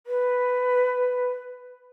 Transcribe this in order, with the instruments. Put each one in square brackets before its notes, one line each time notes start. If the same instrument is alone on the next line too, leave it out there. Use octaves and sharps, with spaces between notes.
[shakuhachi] B4